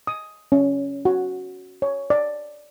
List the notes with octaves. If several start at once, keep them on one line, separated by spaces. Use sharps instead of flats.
D#6
C#4
F#4
C#5
D5